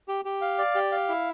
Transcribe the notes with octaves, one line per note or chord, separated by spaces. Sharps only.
G4
G4
F5
D5
G4
F5
E4